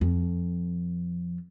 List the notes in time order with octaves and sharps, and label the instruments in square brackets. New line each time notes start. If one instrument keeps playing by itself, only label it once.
[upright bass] F2